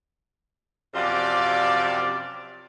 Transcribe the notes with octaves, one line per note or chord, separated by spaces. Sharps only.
F#2 C3 F3 F4 D5